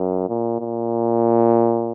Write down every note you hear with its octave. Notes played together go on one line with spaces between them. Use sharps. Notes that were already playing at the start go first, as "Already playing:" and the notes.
Already playing: F#2
A#2
A#2